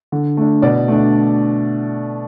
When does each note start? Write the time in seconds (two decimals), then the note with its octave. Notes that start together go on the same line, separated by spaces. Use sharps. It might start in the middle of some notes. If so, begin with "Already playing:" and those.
0.12 D3
0.37 A3 D4
0.62 B2 D5
0.88 A3 D4